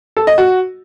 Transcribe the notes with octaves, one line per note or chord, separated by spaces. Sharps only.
A4
D#5
F#4